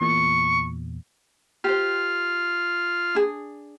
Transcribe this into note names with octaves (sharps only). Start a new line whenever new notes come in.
E2 A#2 C#6
F4 G4 C5 F6
D4 G#4